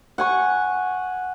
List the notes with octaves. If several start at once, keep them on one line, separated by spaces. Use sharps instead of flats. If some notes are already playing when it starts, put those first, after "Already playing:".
F#5 G#5 C#6